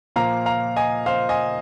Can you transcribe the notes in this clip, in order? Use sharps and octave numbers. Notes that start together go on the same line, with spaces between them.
A#2 F3 A#3 F5 A#5
F5 A#5
D#5 G#5
C5 F5
D#5 G#5